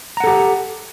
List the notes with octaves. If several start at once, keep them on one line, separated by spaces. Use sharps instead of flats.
G4 A4 F#5 A#5